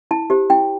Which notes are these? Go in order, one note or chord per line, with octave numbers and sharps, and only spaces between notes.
E4 A5
G4 C5
E4 G5